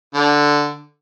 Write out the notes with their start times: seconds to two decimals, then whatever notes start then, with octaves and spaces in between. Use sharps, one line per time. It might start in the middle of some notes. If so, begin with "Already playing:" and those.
0.14 D3